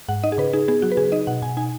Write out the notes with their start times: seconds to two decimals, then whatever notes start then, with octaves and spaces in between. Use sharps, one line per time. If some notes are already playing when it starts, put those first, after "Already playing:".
0.08 G#2 F#5
0.24 D#4 D#5
0.32 G#4
0.38 C#3 B4
0.53 D#4 G#4
0.68 B3 G#4
0.82 F#3 F#4
0.92 B4
0.97 C#3 G#4
1.12 D#4 D#5
1.27 B2 F#5
1.42 B2 G#5
1.57 D#4 G#5